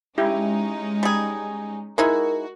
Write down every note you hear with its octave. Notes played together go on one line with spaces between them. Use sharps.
G#3 C#4 D#4 E4 G4
G3 G#4
G#3 D#4 E4 F#4 A#4